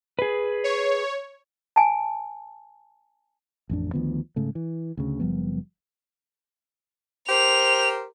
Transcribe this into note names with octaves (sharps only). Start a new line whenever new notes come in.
G#4 B4
C#5
G#5 A5
A1 F2 D4
D2 D#3 F3 B3
G#2 C#3 A3
E3
D2 C#3
F#1 F3 G3 B3
G4 A#4 C5 F7